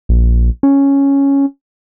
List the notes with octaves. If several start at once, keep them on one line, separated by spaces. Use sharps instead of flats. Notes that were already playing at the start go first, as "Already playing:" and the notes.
A#1
C#4